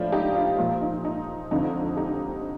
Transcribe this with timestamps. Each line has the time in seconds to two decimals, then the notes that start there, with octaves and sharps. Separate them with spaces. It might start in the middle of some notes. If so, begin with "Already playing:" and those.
Already playing: A2 F3 D4 F4
0.12 D#4 G4
0.35 D4 F4
0.58 A#2 F3
0.81 D#4
1.05 D#4
1.51 F2 D3 F3 D#4
1.97 D#4 G4